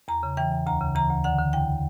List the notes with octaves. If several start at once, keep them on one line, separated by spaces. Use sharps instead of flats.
E2 A#5
C#3
E3 G5
E2
D2 A#5
C#3
E3 A#5
D2
D3 F#5
D3
E2 G5